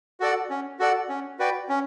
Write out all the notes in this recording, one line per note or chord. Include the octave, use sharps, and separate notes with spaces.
F#4 A4 D5 F#5
C#4
F#4 A4 D5 F#5
C#4
F#4 B4 D5 G5
C#4